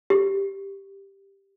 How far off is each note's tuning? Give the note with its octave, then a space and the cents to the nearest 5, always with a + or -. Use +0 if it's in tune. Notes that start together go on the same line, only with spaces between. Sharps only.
G4 +5